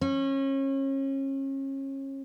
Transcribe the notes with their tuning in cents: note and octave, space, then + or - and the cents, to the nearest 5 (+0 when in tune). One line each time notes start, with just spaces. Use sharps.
C#4 -30